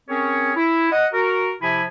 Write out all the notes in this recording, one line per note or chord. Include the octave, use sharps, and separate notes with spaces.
C4 C#4 G#4 A#4 C#5
E4
D#5 F#5
F#4 A#4
C3 F3 E4 E5 G#5 B5